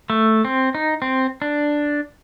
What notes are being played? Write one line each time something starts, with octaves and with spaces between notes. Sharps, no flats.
A3
C4
D#4
C4
D4